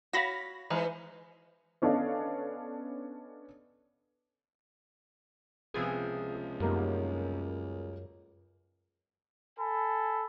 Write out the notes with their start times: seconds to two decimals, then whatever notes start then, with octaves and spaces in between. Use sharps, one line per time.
0.13 F#4 C#5 F5 B5 A#6
0.70 E3 G#3 D#4 B4 C5
1.82 B3 C#4 D4 A4 D#5 F5
5.74 C#2 C3 F3 B3 G#4
6.60 F#2 G3 A#3 D#4
9.59 A4 G#5 B5